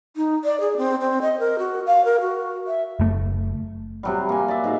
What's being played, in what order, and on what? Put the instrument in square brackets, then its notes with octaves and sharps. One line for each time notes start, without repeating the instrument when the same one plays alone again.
[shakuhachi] D#4
D5
G#4
C4
C4
D#5
A#4
F#4
F5
A#4
F#4
E5
[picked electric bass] F#1 A3
[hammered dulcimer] C3 F#3 G3
A#3 G#5
D5 E5
G#2 F#4 F5